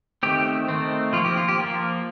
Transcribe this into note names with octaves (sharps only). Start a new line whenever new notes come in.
D#3 A3 C4 G4
D#3 A3 C4
F3 A#3 F4
G4
F4
G4
F3 A#3 F4